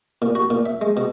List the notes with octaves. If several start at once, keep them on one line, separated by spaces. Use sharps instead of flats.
A#2
F#4
A#2
E5
G#3
B2